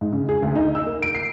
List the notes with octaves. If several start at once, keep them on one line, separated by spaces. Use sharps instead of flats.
G#2
C#3
G#4
D2
D#4
E6
A#3
D7
C7